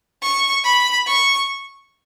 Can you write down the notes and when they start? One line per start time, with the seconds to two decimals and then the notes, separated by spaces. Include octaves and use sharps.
0.23 C#6
0.64 B5
1.07 C#6